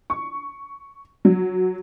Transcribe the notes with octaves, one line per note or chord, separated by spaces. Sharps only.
C#6
F#3